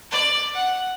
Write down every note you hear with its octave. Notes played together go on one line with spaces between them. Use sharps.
D5
F#5